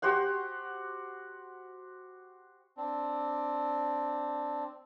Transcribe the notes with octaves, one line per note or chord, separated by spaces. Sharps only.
F#4 G4 C5 F#5
C4 D4